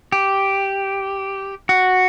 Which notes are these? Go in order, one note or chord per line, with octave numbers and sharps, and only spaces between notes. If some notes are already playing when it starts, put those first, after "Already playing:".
G4
F#4